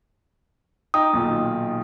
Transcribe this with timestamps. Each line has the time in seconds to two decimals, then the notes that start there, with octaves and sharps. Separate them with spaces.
0.94 D#4 G5 A#5 D#6
1.13 B1 A#2 D#3